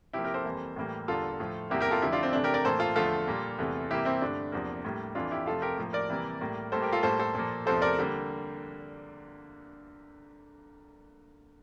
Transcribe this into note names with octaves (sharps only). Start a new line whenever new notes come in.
C3 F3 A#3 E4 G4
G4 A#4
A4 C5
F2 E3 G3 A#3
A2 E3 G3 A#3
E2 D3 G3 A#3 F4 A4
A2 F3 A3
E2 C3 G3 A#3 E4 G4
G4 A#4
F4 A4
F2 D3 F3 A3 E4 G4
D4 F4
C4
C3 E3 A3 D4
G4 A#4
A#4 D5
A2 E3 A#3 A4 C5
F4 A4
E2 D3 F3 A3 F4 A4
A#2 G3 A#3
E2 C3 E3 A3
C3 E3 G3 A#3 E4 G4
C4 E4
G2 D3 A3 D4
E2 C3 F3 A#3
A2 G3 A#3
F2 E3 A3 D4 F4
E4 G4
F2 C3 F3 A3 F4 A4
G4 A#4
A2 F3 A#3
A#4 D5
C3 E3 G3 A#3
A2 G3 A#3
A2 G3 A#3 A4 C5
G4 A#4
F4 A4
A2 G3 A#3 A4 C5
A4 C5
A#2 F3 A#3
E2 C3 F3 A3 A4 C5
A#4 D5
D3 G3 A#3